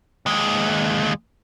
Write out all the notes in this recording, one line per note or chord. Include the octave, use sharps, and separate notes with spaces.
D#2 G#3